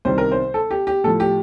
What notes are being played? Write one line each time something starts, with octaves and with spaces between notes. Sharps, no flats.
C2 C3 D#3 G3 C5
A#4
C5
A4
G4
G4
A2 F3 A4
G4